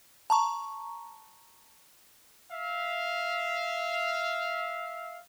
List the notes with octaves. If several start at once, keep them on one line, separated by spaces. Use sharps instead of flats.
A5 A#5 C#6
E5 F5